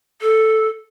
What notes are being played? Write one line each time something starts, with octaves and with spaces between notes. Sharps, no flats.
A4